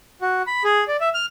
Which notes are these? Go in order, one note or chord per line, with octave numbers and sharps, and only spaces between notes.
F#4
B5
G#4
D5
E5
F6